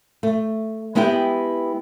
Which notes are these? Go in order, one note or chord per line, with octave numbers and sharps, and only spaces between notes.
A3
G#3 B3 E4 G4 B4 G5